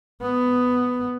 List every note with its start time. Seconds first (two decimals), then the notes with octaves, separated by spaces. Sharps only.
0.22 B3